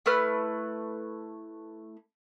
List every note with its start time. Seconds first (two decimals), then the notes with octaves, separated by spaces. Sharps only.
0.06 A3 E4 B4 F6